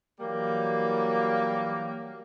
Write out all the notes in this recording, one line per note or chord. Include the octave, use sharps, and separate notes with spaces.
E3 F#3 G3 A#3